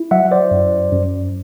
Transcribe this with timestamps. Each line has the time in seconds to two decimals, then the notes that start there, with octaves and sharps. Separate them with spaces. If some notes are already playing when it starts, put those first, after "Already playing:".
Already playing: E4
0.11 F#3 E5 F#5
0.31 C5 D5
0.51 F#2
0.92 F#2